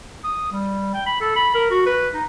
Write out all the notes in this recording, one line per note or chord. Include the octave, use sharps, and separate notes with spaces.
D#6
G3
G5
B5
A4
B5
A#4
F#4
B4
D#4